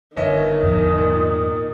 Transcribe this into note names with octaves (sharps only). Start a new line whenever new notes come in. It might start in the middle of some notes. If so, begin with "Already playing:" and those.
G1 D#3 C#5 D#5 E5
E2 G#2 F3 D#6
A#2